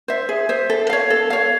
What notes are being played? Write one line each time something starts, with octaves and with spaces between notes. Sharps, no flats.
C5 E5
G#4
C5 E5
A4
C#5 F5
A4
C#5 F5